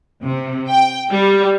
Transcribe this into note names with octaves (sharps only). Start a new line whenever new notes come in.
C3
G5
G3